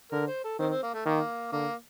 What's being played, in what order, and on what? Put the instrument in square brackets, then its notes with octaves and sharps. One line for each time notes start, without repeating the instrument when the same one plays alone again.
[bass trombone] D3 [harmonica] A#4
[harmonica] C5
A4
[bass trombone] D#3 [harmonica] C4
[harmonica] C4
A#3
A3
[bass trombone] D#3 [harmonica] A#3
[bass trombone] D3 [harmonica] A#3